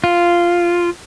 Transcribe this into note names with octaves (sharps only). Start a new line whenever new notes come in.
F4